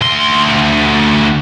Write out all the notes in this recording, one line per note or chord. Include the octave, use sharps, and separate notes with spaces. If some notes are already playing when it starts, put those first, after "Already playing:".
D2 C6